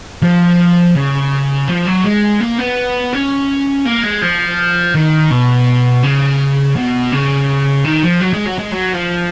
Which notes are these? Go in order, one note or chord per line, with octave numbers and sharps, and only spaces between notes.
F3
C#3
F3
F#3
G#3
A#3
B3
C#4
A#3
G#3
F3
D#3
B2
C#3
B2
C#3
D#3
F3
F#3
G#3
F#3
G#3
F#3
F3